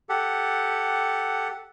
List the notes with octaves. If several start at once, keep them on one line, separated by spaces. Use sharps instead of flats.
G4 A4 F#5